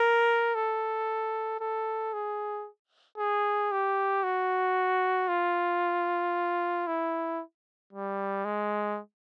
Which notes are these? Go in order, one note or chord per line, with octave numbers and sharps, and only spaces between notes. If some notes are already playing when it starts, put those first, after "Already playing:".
Already playing: A#4
A4
A4
G#4
G#4
G4
F#4
F4
E4
G3
G#3